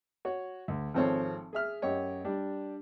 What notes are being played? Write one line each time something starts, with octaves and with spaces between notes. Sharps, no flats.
F#4 C#5
D2
G#1 F3 C4 A4 C#5
G#4 E5 F6
F#2 G4 C#5 D#5
G3 D4